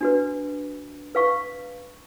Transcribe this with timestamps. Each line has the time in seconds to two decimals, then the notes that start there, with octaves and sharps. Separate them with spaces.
0.01 D4 F#4 B4
1.15 B4 F5 C#6